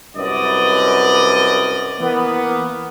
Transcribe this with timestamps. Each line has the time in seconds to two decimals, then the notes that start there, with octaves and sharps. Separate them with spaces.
0.16 C2 F#2 B4 D5 D#5
1.99 E3 A#3 B3